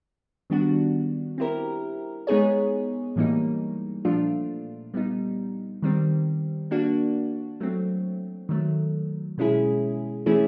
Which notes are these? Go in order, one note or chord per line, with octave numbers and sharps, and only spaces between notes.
D#3 G3 B3 D4 F#4
C4 E4 G4 A#4
G#3 B3 D#4 G#4 C#5
A2 E3 G3 A#3 D#4
A#2 F3 A3 D4 F4
G3 B3 D#4
D#3 G3 C4
A#3 D4 F#4
F#3 A3 C4
D#3 F#3 A3
B2 G#3 C#4 E4 G#4
E3 A3 C#4 E4 G#4